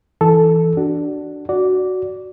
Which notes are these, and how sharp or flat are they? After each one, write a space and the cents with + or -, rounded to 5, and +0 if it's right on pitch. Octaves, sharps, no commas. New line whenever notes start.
E3 +0 A4 +0
D4 +0 F#4 +20
F#4 +0 D5 -15